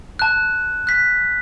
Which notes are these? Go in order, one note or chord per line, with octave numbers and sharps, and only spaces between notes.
A5 F#6
F#6 B6